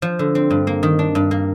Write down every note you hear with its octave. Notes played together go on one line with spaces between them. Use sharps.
F3
D3
C4
G2
A#3
D#3
D4
G2
A#3